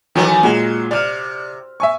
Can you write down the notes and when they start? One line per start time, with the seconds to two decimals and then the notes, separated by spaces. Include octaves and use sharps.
0.16 D#3 E3 F#3 A3 B3 G#5
0.43 A#2 F#3 G#3
0.91 C3 D5 F6
1.80 E5 G#5 C#6